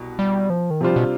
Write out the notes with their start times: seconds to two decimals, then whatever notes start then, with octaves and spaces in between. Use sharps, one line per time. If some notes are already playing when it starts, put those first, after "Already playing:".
Already playing: C2 B2
0.19 G3
0.50 F3
0.70 D#3
0.81 C3 F3 G3 D4 F4 C5
0.96 B2